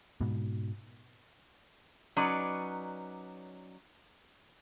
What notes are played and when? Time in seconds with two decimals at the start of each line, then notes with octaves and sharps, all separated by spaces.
0.21 G#2 B2
2.16 F#3 C#4 D#4 B4 D5